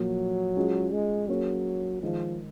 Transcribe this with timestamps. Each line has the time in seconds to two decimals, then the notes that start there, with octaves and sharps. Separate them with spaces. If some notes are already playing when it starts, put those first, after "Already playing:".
Already playing: A#2 F3 F#3 A#3 F4
0.57 G#3 C#4 F4 G#4
0.93 G#3
1.28 F#3 A#3 C#4 G#4 C#5
2.02 D#3 F3 G#3 D#4